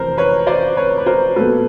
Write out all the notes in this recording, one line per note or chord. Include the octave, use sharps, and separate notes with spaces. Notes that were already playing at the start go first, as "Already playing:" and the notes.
Already playing: F2 C3 E3 A#4 C5
B4 C#5
C5 D5
B4 C#5
B4
A#4 C5
B1 A#2 F#3 B3 A4 B4